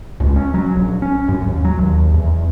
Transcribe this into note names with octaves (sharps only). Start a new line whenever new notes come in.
C#2
C#4
F#3
A#1
C#4
F#2
D#2
F#3
D#2
E2